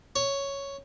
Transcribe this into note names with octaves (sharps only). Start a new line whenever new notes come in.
C#5